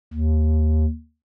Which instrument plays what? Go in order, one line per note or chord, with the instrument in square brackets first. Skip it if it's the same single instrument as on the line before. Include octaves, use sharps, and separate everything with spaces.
[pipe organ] D#2